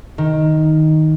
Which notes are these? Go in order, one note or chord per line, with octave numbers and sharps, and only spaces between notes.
D#3